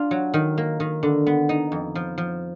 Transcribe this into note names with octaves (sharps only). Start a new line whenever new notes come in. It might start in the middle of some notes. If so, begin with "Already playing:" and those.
Already playing: D4 F4
F#3
D#3
A#3
D#3
D3
B3
D#4
F2
F3
F3